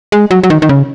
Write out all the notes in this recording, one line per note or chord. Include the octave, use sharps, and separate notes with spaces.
G#3
F#3
F#3
D#3
D#3
C#3